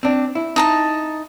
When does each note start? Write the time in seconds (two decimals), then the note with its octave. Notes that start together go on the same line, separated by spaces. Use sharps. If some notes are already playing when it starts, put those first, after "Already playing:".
0.03 C4 D4
0.35 E4
0.56 D#4 A5 A#5